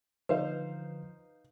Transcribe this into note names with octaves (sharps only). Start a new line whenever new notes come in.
D3 F3 D#4 B4 C5 F5